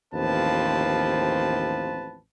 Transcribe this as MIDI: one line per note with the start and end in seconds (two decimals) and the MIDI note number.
0.14 2.19 33
0.14 2.19 39
0.14 2.19 53
0.14 2.19 60
0.14 2.19 71
0.14 2.19 81